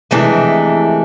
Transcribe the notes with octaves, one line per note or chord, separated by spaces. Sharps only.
C3 E3 G#3 A3 D4